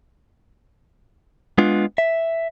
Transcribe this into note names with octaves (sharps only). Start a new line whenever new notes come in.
G#3 B3 D4 F4
E5